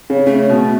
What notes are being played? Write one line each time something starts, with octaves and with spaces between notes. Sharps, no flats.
C#3
C#3 A3
B2